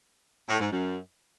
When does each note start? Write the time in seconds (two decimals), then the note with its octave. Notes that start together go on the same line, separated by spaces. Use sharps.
0.49 A2
0.60 G#2
0.72 F#2